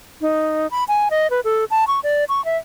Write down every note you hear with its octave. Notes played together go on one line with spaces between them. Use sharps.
D#4
B5
G#5
D#5
B4
A4
A5
C#6
D5
C#6
E5